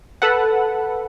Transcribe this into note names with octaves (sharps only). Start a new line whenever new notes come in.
A4 B4 F#5